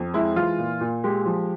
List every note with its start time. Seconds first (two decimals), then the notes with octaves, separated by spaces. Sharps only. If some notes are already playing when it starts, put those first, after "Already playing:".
Already playing: F2
0.14 G#3 E4
0.36 E3 F4
0.58 A#2
0.81 A#2
1.04 G#3 G4
1.26 F3